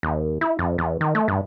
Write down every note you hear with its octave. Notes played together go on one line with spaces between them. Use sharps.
D#2
E4
F2
E2
D#3
A3
G2